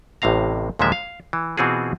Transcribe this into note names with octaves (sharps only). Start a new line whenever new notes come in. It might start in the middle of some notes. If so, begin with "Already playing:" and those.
A1 A2 C3 F5 A#5
D#2 A#2 D3 F3 G#3 E5
F5
E3
B2 E3 C4 F4 F#4 G#4